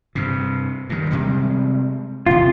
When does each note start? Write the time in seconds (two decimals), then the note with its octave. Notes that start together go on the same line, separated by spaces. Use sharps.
0.15 G2 C3
0.89 G2 D#3
1.11 C3 G3 G#3
2.26 E1 C3 F4